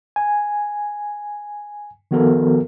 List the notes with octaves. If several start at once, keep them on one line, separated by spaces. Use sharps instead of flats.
G#5
D#3 F3 B3 F#4 A4 A#4